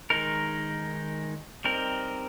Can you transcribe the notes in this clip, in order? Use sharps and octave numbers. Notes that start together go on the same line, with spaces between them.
D#3 G#3 D#4 A#4
G3 C4 D#4 A#4